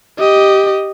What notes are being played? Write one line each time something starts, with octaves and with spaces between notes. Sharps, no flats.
G4 D#5